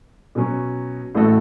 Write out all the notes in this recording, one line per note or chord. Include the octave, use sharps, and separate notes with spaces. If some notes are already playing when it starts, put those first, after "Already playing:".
B2 F#3 C#4
A1 A2 A3 F#4 A4